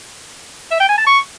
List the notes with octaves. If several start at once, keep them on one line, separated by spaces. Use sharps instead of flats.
E5
G5
G#5
A5
C#6